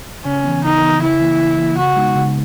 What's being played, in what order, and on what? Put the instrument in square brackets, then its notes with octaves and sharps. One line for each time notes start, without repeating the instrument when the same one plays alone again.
[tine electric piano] C#3 [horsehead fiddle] C#4
[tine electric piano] E3 B3
[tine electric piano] C#3 [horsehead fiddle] D#4
[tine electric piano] E3 B3
[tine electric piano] C#3 [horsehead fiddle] E4
[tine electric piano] E3 A#3
C#3
E3 A#3
[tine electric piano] C#3 [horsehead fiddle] F#4
[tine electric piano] G#3 B3 D#4
C#3